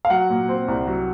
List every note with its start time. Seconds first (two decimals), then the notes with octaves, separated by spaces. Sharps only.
0.05 F5
0.10 F#3 F#5
0.29 A#2
0.49 C4
0.68 C2
0.87 F#3